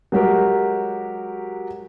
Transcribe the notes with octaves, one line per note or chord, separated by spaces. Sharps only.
F#3 G#3 F#4 G4 A#4